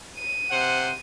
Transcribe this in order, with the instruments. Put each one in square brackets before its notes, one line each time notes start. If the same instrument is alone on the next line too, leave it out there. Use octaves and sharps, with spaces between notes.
[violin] D#7
[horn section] C3 C5 F#5